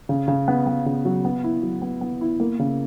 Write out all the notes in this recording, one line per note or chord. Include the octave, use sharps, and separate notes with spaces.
C#3
C#3
B3
B3
C#3
F#3
B3
E4
F#3
B3
B3
E4
A#3
C#3